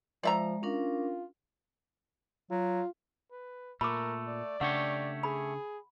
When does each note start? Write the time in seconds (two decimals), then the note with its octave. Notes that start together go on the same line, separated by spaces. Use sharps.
0.23 F3 G#3 D5 E5 A#5
0.63 C#4 D4 F4 A#4
2.51 F#3 F4
3.32 B4
3.81 A#2 A3 A#4 B5 D6
4.28 D5
4.61 C#3 A3 D4 G4 C#5 F#5
5.23 G#4 B5